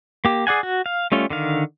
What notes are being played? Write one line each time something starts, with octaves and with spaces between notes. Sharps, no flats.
A#3 G4
G#4 D5 F#5 G#5
F#4
F5
G3 A3 C#4 F4
D3 D#3 F5